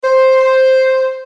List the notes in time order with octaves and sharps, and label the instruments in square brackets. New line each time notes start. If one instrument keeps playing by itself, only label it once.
[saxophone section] C5